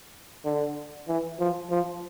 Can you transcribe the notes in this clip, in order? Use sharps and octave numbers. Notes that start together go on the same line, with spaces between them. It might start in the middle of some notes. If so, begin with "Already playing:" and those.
D3
E3
F3
F3